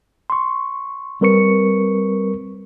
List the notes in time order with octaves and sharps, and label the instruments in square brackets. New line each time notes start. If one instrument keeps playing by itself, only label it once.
[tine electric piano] C6 C#6
G3 C4 A#4 B4 C#6 C#7